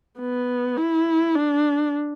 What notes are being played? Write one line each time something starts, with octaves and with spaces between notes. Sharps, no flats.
B3
E4
D4